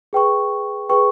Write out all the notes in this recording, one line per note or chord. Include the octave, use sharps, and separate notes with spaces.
G#4 B4 G5 C#6
G#4 B4 G5 C#6